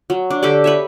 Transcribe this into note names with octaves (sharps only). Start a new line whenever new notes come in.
F#3
D4
D3 G4 A4 D5
B4 C#5 E5